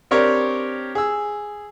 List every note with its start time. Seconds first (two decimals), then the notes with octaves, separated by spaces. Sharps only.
0.11 C4 D4 G4 A#4 C#5 D5
0.95 G#4 E6